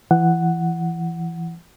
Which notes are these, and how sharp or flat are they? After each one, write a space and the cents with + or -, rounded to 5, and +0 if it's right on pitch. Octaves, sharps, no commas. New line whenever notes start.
E3 +25 F#5 +0